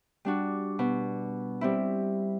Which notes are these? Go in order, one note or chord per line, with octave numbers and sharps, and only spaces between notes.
G3 D4 F#4
B2
G3 C4 E4